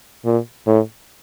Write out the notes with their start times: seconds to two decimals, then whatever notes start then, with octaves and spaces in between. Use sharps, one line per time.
0.25 A#2
0.67 A2